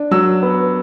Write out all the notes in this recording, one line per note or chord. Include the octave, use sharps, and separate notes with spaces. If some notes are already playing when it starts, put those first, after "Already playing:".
Already playing: D4
F#3 E6
B3